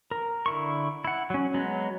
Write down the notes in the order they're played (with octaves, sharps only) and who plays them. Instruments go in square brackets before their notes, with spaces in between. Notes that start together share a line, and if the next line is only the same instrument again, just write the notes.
[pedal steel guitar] A#4
D3 E4 C#6
E4 F#5
F#3 C#4
F#3 G#3 B3